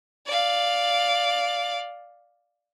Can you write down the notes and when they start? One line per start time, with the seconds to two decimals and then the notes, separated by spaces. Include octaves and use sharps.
0.26 D5 F5